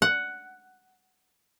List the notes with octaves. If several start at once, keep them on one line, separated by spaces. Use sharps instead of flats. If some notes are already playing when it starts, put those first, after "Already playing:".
F#5